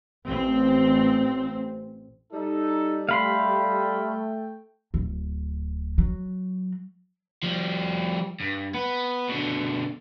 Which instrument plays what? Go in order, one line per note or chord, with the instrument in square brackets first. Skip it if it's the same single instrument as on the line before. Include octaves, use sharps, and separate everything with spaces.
[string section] A1 C4
[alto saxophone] G3 [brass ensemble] D#4 A4
[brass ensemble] A3 G5 [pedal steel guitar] F5 B5 C6
[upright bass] D1
F#3
[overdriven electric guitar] F3 G3
G2
B3
B2 D3